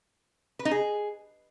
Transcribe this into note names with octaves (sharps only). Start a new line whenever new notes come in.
B4
D#4
G#4